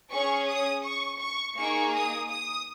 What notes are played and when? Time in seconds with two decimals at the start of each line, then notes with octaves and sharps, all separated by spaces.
0.12 C#4 G#4 C#6
0.48 D#6
0.85 C#6
1.21 C#6
1.57 A#3 D#4 G#4 C#6
1.95 D#6
2.30 D#6